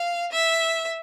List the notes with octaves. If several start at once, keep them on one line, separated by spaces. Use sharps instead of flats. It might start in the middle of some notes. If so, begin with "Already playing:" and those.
Already playing: F5
E5